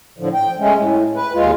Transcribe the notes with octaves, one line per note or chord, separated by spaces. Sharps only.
A2 D3 F3
G5
G#3 A3 C#4
A2
B4
D#2 G#3 F4